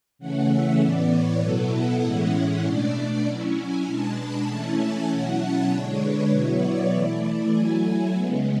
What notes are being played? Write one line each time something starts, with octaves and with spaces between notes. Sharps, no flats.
C#3 E3 A3 C#4 F#5
E5
A2 E3 B3 D5
C#5
B2 F#3 B3 E4 A4
F#5
A2 E3 G#3 C#4 E4
B2 A3 D4 D5
F#3 C#4 E4
G#5
B2 G#3 D4 A5
B5
E3 A3 C#4 E4 A5
G#5
B2 F#3 C#4 E4 F#5
A5
D3 G#3 D4 C#5
B4
B2 F#3 B3 E4 C#5
D5
E3 A3 E4
F#3 A3 E4 G#5
C#3 G#3 B3